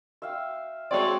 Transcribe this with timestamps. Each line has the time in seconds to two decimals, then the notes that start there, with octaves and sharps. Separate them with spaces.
0.22 E5 F5 G5
0.91 G#3 C4 F#4 A4 C#5 D5